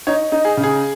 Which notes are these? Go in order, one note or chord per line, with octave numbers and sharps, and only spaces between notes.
D#4 C#5
D#4
G#4
C#3
G#4